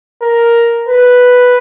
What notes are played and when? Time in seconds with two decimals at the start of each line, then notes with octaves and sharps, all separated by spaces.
0.22 A#4
0.88 B4